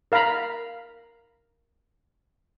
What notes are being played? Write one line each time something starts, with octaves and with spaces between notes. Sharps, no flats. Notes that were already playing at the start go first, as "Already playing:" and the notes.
A#4 F5 A#5 B5